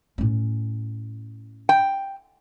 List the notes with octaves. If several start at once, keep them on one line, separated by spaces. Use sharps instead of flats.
A2 C#4
G5